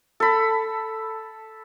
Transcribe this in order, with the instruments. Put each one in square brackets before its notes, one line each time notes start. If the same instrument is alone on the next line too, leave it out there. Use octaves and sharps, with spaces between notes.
[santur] A4 B5